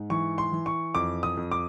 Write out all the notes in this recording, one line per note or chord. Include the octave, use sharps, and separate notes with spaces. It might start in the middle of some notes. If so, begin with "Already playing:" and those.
Already playing: G#2
E3 C#6
C6
E3
C#6
F2 D6
D#6
F2
D6